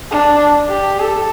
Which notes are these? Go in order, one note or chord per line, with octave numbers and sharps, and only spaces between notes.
D4
G4
A4